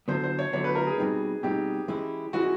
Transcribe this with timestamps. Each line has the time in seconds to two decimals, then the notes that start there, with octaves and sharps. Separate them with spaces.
0.08 D3 F#3 B3 C5
0.24 C5
0.39 C#5
0.53 D3 F#3 B3 C#5
0.64 B4
0.75 A#4
0.87 G#4
0.98 B2 G3 C4 D#4
1.43 B2 G3 C4 D#4 G4
1.88 E3 G#3 C#4 E4
2.33 E3 G#3 C#4 E4 F#4